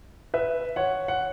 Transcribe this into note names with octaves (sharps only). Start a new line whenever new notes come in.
B4 E5
C#5 F#5
F#5